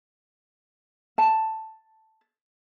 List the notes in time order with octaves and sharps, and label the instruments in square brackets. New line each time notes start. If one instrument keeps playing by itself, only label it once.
[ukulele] A5